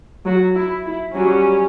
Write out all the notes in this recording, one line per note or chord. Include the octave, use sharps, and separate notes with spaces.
F#3 F#4
E4
E4
F#3 G3 C#4 F#4